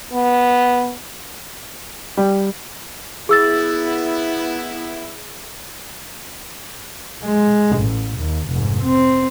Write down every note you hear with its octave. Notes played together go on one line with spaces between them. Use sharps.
B3
G3
B3 E4 G#4 E6 A6
G#3
A1
D#2
F1 G#2
C4